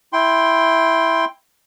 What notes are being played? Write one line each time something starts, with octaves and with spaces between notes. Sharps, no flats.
E4 G5 C6